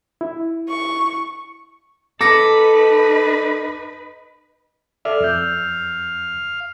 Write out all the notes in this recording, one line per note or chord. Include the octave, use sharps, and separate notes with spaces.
E4
C#6
D#4 A4 B4 D6 A#6 C#7
A4 D5 E5 F5
F2 E6 G6